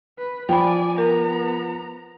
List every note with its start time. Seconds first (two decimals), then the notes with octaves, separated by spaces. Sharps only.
0.18 B4
0.49 F3 D5 G5 G#5 B5
0.98 B3 A#4 A#5